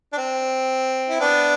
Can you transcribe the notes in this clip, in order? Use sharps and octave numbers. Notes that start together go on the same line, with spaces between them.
D4
C4
E4
B3 D4